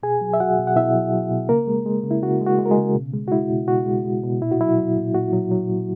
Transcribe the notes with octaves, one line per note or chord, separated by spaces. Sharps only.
B2 G#4 G#5
F#3
E5
F#3 F#4 F#5
B2
F#5
B2 E4 E5
F#3
F#3
B2
C#3 A#3 A#4
G#3
G#3
C#3
E4
C#3 F#4
G#3
F#4
G#3
A#4
G#3 G#4
C#3
B2
G#3
F#4
G#3 E4
B2
B2 F#4
G#3
G#3
B2
A#2 E4
F#4
F#3 E4
F#3
A#2
A#2 F#4
F#3
F#3
A#2